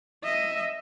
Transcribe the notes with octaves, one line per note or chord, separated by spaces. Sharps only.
D#5 E5